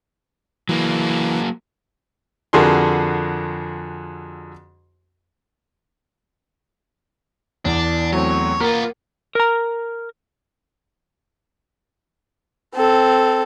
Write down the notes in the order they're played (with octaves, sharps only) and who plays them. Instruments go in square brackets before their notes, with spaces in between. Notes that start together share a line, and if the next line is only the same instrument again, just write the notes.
[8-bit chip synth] E3 [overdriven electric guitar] F#3 A#3
[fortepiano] F2 D3 F#4 G#4 A#4 C6
[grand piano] E2 [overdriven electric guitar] D4
[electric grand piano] F#3 A3 C4 [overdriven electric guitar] C#5
[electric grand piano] A#3 [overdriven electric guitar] B3 F4 [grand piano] A#4
[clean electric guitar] A#4 A#5
[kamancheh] C4 A4